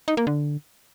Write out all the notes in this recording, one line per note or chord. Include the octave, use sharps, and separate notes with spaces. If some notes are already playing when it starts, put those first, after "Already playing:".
D#4
A#3
D3